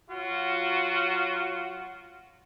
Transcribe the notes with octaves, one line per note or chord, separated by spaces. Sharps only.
F#3 F4 F#4